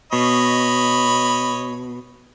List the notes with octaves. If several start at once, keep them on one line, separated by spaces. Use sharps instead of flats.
B2 C#5 D#5 B5